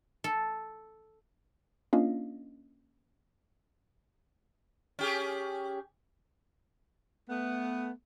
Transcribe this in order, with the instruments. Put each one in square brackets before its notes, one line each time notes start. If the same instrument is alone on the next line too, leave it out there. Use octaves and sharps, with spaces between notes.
[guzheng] A4
[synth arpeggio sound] A#3 C#4 D4 F4 D#5 F5
[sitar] C#4 G4 G#4
[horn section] A3 B3